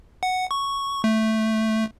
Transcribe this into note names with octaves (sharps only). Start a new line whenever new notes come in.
F#5
C#6
A3